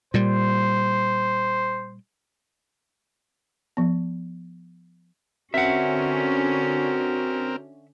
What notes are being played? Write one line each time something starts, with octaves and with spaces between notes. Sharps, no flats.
A#2 G3 C5
F3 B3
D3 C4 C#4 F#4 A#4 E5 F#5